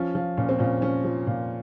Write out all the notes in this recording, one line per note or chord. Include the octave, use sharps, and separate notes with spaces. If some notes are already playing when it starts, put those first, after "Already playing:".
Already playing: F3 C#4
F3
A#2 C#4
C4
A#2 C#4
F3 C#4
F3
A#2